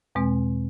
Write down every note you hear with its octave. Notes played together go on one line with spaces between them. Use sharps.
E2 B2 G#3 C4